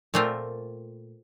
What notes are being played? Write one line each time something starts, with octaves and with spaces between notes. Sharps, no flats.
A#2 A3 C4 F4 A#4